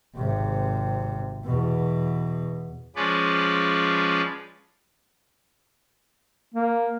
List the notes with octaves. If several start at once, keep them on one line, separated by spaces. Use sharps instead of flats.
G#1 C3
E2 B2
F3 G#3 C#4 B4 D5
A#3